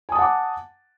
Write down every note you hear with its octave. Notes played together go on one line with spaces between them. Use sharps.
F#5 G#5 A5 D6 D#6